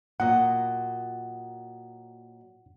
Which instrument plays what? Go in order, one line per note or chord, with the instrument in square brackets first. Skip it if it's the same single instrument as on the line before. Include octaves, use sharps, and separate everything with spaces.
[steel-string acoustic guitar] A#2 F#3 D#5 [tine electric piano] F#5